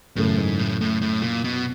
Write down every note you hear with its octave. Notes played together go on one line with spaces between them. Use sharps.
F#2 A2 C#3 E3 A3
G#2
A2
A2
A2
A#2
B2